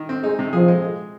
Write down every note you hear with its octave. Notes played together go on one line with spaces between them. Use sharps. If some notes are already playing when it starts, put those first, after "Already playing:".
Already playing: D#3
C4
G#3 D#4
C3
F3 G#4
G#3
G#3